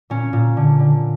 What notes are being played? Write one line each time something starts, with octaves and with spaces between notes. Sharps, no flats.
A#2 C#4
A#2
D3
D3